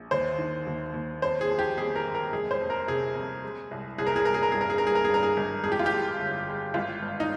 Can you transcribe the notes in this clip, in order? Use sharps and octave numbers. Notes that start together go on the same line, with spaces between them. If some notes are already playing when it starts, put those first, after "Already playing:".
Already playing: A#1
D#2 C5
D#3
D#2
D#2
F2 C5
G#4
F3
G4
F2 G#4
A#4
G#3
A#4
F1 G#4
C5
F2
A#4
C3 G#4
F2
G#3
C2
C2 G#4
A#4
G#4
C2 A#4
G#4
A#4
G2 G#4
A#4
G#4
G2 A#4
G#4
A#4
G2 G#4
A#4
G#4
G#1
F2 G#4
G4
F4
G4
G#3
G1
G#3
G#1 F4
G2
D#4